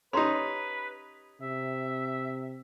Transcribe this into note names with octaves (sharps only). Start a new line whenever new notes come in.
C#4 D#4 G4 B4 A#5 C6
C3 E5